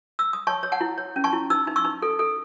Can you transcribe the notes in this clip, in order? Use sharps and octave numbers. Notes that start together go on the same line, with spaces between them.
E6
D#6
C#5 A5 C#6
C#5
F#5 A5
E4
C#5
C#4
A5 C#6
E4
D#4 E6
D#4
C#6 E6
D#4
A4
A4